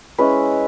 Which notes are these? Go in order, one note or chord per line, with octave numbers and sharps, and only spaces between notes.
G#3 C#4 E4 B4